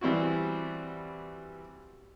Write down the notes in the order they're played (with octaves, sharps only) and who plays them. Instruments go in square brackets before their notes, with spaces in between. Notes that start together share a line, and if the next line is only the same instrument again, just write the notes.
[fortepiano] E3 G3 C4 E4 F#4